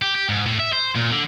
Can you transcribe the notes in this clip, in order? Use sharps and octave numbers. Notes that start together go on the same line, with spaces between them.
G4
G4
G#2
A2
E5
C5
A#2
D3